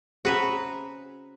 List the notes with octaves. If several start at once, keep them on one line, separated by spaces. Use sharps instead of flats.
C#4 F#4 G#4 B4 C5 E5 A#5